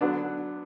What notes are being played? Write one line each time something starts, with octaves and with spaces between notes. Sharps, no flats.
D3 F#3 B3 D4